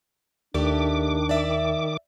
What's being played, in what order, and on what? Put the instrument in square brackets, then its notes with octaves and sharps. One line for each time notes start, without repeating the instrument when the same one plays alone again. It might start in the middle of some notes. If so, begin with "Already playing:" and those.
[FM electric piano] D#2 [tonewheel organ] D#3 D6 [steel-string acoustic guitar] A3 G4 D5 [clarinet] D4
[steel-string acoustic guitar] D5 E5